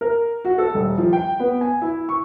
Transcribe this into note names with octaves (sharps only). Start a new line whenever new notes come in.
A#4
F#4
A4
D#1
F3
G5
B3
G#5
E4
C#6